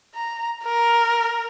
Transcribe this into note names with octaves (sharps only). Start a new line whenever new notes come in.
A#5
A#4